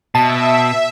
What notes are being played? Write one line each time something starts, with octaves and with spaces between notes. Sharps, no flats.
B2 E5 A5